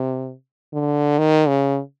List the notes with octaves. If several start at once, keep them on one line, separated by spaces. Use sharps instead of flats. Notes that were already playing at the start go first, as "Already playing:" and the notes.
Already playing: C3
D3
D#3
C#3